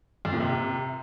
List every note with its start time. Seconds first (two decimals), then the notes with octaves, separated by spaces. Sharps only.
0.25 F2
0.33 A#2
0.40 C3